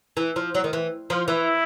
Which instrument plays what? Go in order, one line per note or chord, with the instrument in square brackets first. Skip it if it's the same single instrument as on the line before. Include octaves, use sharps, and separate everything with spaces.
[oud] E3
F3
F#3
D#3
E3
F3
[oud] E3 [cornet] E4